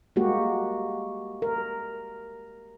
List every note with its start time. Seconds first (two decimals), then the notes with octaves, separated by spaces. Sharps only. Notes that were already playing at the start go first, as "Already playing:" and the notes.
0.16 G#3 A#3 F#4 G4
1.42 A#4